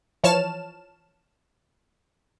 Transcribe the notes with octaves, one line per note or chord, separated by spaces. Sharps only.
E3 F3 C#5 A5 F6 E7